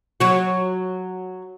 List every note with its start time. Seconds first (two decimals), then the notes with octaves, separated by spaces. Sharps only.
0.20 F#3 F#4